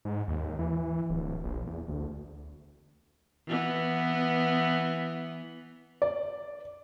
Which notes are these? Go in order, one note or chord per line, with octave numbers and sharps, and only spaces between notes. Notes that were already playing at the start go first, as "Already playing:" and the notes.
G#2
D#2
E3
D1
A#1
E2
D2
E3 B3
D5